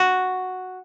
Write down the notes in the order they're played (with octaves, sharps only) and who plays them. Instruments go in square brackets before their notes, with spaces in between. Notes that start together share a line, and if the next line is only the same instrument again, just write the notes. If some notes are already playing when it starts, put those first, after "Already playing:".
Already playing: [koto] F#4